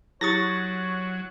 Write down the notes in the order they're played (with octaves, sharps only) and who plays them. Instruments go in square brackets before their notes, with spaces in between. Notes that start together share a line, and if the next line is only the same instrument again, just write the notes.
[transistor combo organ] F#3 [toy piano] E4 G4 D#6 [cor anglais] C#5 [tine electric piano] C#6 A6 A#6